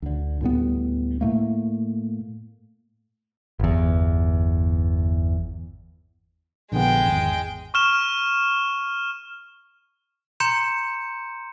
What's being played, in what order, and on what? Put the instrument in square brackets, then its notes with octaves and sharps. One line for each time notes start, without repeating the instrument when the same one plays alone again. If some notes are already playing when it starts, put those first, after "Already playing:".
[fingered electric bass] D2 D3
D2 A2 G3 B3
A2 A3 A#3
[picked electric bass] G1 E2
[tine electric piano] A#1 D3 B3 [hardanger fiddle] G#3 G5
[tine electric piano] G#1 E2
[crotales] C#6 F6 E7
[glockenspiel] A#5 C6 G6 C#7 E7